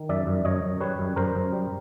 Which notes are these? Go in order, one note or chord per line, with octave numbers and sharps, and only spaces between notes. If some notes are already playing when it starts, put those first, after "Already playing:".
Already playing: D#3
F#2 D5 E5
F#2
F#2 C#5 D#5
F#2
G3 B4 C#5
F#2
F#2 A#4 C5
F#2
G3